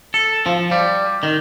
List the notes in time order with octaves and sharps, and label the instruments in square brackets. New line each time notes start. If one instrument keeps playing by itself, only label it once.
[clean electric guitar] A4
F3
G3
D#3